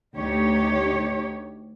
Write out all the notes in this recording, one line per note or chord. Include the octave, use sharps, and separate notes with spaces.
D2 D#4 G4 C#5